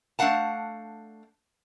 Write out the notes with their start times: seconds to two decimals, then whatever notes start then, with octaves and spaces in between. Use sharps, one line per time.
0.19 A3 D4 F5 F#5 A5